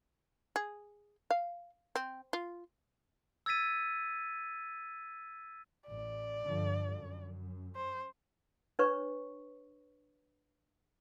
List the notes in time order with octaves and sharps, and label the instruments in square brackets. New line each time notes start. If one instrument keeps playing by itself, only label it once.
[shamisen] G#4
F5
C4
F4
[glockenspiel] E6 G#6 A6 B6 D#7
[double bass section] A1 [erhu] D5
[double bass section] G2 D3 F3
F#2
[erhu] C5
[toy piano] D4 B4 C#5 C#6